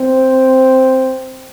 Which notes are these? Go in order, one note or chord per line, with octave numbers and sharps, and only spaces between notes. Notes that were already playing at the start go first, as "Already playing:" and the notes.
Already playing: C4